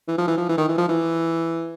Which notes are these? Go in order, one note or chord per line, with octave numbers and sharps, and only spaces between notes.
E3
F3
E3
F3
E3
D#3
E3
F3
E3